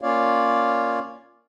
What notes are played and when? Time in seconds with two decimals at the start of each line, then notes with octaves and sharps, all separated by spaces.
0.01 A#3 C#4 F4 C#5 D5 F5